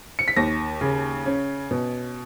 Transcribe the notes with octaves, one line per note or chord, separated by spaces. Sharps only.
C#7
B6
D#2 A#6
C#3
C#4
B2